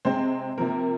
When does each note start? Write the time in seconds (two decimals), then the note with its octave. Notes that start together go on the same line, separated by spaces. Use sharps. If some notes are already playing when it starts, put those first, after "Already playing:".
0.05 C3 G#3 C4 C5
0.58 C3 F3 A#3 A#4